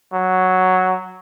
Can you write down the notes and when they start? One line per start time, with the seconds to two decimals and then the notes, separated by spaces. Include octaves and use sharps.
0.13 F#3